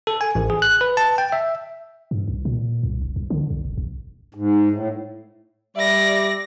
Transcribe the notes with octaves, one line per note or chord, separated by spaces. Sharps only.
A4
G#5
A1
G#4
F#6
B4
A5
G5
E5
G2
C2
A#2
C2
F#1
C2
D3
B1
D#1
A#1
G#2
A2
G3 D5 E5 A#6